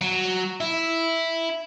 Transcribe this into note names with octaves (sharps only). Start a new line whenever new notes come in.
F#3
E4